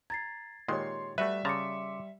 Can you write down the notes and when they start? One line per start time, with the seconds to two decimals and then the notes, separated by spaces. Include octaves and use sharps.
0.10 A#5 G#6 A6 C7
0.68 A#2 D#3 G#3 G4 C#5 C6
1.18 G3 A3 F#4 B4 E5
1.45 C#3 A5 A#5 C6 D6 C#7